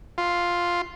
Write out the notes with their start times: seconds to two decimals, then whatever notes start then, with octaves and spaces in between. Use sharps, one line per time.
0.18 F4